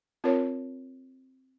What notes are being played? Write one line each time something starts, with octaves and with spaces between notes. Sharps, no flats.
C4 F4 A#4 C#5